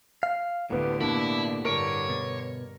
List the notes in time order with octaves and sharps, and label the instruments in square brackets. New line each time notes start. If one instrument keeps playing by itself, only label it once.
[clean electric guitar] F5
[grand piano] D2 B3 [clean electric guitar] A2 [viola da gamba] D3 A3 G4
[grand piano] B2 A#3 D4 [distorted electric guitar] E4
[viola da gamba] G2 D3 [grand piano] A#4 D7 [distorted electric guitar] C#5
[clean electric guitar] B2